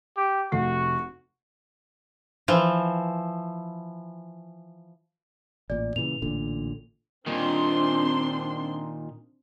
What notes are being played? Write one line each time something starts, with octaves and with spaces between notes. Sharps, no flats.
G4
F1 A3 F#4 C7
E3 F3
A1 A#2 D5
A#2 C#3 E3 F7
A1 A#2 D3
A#2 D#3 C4 D4 C6